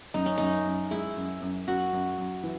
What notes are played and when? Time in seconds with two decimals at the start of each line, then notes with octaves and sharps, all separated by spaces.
0.14 F#2 D#4
0.26 C#4
0.38 F#2 D#4
0.65 F#2
0.91 G#3 E4
1.16 F#2
1.41 F#2
1.67 F#2 F#4
1.93 F#2
2.18 F#2
2.43 E3